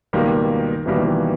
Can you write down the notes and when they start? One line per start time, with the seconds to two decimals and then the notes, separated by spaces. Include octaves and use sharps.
0.13 C#2 B2 D#3 G3 A#3
0.85 C#2 B2 E3 G3 A#3
0.95 D#3
1.04 E3